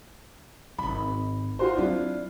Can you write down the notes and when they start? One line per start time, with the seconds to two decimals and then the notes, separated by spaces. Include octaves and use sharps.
0.78 D#1 G#1 B5
1.59 F4 F#4 C5
1.77 F#3 C4 D4 E4 F4